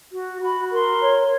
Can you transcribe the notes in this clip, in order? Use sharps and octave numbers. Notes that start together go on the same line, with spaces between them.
F#4
F#4 B5
A#4 C6
C#5